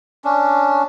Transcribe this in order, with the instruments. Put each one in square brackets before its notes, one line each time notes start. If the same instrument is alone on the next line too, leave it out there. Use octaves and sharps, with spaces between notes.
[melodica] C#4 D4